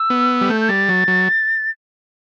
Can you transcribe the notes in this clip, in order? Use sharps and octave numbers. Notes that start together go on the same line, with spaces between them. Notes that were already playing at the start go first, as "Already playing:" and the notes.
Already playing: E6
B3
G3
A3 G6
G6
G3 A6
F#3
F#3